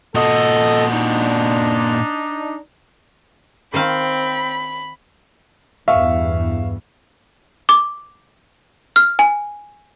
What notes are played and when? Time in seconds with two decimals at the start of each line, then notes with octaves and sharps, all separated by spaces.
0.15 A#2 F#4 A4 D#5
0.91 D4 D#4
3.74 D#3 C4 C5 F5 B5
5.88 E2 G2 E5 F5 C#6
7.69 D6
8.96 F6
9.19 G#5